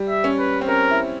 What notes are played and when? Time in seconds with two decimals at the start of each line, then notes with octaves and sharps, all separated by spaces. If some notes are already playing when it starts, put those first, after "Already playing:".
Already playing: G3
0.09 E5
0.24 C#4
0.39 B4
0.61 C4
0.68 C#4 A#4
0.91 E4